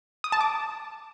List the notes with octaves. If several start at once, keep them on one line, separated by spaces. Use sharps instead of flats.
D#6
A5
D6